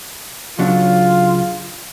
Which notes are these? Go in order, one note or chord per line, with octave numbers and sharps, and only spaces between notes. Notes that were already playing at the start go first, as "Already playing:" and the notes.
C#2 F#3 D4 F4